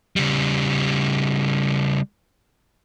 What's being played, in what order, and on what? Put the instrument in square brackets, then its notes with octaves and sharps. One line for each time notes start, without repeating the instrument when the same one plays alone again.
[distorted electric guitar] C#3 G3